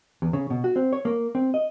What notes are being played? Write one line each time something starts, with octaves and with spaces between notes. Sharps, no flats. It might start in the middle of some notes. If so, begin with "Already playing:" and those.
E2
C#3
B2
F#4
C4
C#5
A#3
C4
D#5